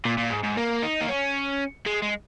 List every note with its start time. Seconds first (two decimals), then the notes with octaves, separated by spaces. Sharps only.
0.05 A#2
0.18 A#2
0.31 G#2
0.44 G#2
0.57 A#3
0.83 D#4
1.01 A#3
1.09 C#4
1.86 G#3
2.02 G#3